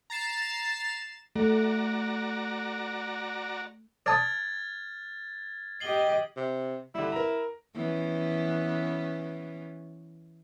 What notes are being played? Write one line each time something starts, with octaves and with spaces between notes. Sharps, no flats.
A#5 A6 C7 E7
A3 F#4 D5 A#5
D5 A5 D#6 F6 G#6 A6
G4 D#5 C7 F#7 G7
C3
D3 G3 E4
A#4 A#5
E3 B3 C#4